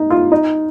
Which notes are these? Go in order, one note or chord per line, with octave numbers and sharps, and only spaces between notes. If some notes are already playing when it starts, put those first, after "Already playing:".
Already playing: D#4
F4
D#4